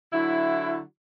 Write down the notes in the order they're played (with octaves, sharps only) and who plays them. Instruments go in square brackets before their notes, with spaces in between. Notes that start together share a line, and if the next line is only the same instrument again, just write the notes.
[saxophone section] D3 F#3 E4